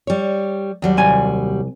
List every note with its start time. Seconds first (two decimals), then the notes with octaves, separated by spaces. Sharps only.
0.07 G3 C#5
0.82 D#2 F#3 G3
0.97 C2 G#5